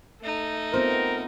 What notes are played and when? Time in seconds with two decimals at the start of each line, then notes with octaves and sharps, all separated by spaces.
0.21 A3 D#4
0.74 B3 C4 F4 A#4 C5